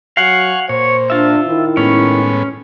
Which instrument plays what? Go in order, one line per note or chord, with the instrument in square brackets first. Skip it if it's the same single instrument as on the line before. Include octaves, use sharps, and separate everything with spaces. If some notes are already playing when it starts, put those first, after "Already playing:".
[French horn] F#3 [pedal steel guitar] F5 F#5 [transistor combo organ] G#5 C#6
[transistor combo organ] A#2 [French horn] C5 [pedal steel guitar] C#5
[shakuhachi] D4 [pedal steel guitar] F4 E5
[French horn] D#3 [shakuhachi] E4
[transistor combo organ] A2 G#3 B3 [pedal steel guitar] C#4